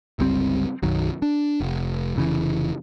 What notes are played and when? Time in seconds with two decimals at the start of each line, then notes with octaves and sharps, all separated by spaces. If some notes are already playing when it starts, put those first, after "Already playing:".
0.19 G1 C#2 G3 C4
0.83 B1 F#2 D#3 F#3
1.22 D4
1.60 F1
2.16 F1 C#3 E3